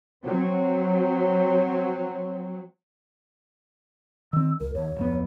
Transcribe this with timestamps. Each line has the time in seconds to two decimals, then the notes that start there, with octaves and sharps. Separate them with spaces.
0.24 F#3 C4
4.33 D#3 C4 E6
4.60 C#2 A#4
4.75 D#2 C#5
4.96 D1 F2 B3